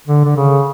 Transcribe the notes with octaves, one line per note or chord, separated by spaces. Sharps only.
D3
D3
C#3